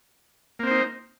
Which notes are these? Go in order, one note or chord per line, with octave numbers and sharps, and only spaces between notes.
A#3 C4 D#4 C5